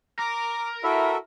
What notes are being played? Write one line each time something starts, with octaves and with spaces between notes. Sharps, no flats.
A#4 A#5 D6
E4 F#4 A4 E5